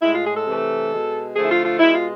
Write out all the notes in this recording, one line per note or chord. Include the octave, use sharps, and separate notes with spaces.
A2 G#3 E4
F4
G#4
A4
C3 E3 A3
B2 G#3
D3 F3 A3 G#4
E4
F4
F4
B2 G#3 E4
F4